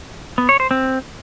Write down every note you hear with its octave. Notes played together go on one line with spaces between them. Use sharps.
B3
C#5
C5
C4